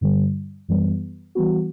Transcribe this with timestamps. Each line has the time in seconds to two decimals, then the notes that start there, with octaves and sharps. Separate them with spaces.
0.01 G2 D3 G3
0.68 F#2 E3 G3 B3
1.35 E3 G3 B3 F#4